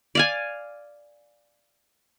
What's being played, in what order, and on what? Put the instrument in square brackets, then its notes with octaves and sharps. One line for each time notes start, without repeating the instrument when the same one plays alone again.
[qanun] D5 F5 G#5